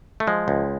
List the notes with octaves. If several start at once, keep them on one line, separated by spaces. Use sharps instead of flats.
A3
F3 G#3
C#2